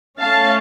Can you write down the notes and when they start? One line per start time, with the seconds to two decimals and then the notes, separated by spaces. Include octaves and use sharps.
0.20 A3 C#4 F5 A5